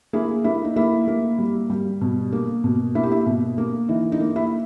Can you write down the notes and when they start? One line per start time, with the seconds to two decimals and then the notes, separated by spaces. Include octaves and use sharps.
0.13 A#3 E4 G#4
0.44 A#3 E4
0.65 D#4
0.76 A#3 E4
1.08 A#3
1.39 G3
1.70 G3
2.01 B2
2.32 A#3
2.64 B2
2.95 A#3 E4
3.03 G4
3.12 E4
3.26 B2
3.58 A#3
3.89 E3 D#4
4.12 D#4
4.20 A#3
4.36 E4